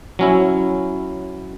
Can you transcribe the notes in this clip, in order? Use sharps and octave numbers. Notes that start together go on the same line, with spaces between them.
F#3 C#4 E4